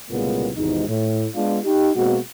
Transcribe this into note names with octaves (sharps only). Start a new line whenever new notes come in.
C2 A#2 C#3 G#3 A#3 B3
G#1 E2 G#2 C3 D#4
A2
G#3 B3 D4 F4
D#4 G4
B2 G#3 A#3 C4 F#4